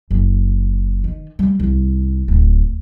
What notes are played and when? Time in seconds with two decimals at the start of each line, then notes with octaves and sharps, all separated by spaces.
0.11 F#1
1.04 D#3
1.39 G3
1.60 C2
2.28 D1